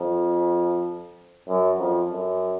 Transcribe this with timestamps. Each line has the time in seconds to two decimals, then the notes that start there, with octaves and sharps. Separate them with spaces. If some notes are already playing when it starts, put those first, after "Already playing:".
Already playing: F2
1.48 F#2
1.79 F2
2.11 F#2